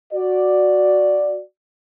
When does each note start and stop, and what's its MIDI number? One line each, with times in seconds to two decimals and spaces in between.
0.13 1.40 66
0.13 1.40 74